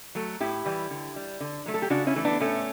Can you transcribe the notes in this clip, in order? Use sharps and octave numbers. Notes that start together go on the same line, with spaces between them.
F#3 A3
A2 E4 G4
E3 G3
D3
G3
D3
F#3 A3
A4
G4
C#3 D4 F#4
C#4 E4
E3 A3
B3 D4
A2 A3 C#4